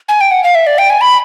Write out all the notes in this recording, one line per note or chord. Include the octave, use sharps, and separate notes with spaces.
G#5
G5
F#5
F5
E5
D5
G5
G#5
B5